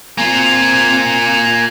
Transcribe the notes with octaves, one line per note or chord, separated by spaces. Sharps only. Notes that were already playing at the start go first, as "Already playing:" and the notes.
A#3 C4 F4 G#5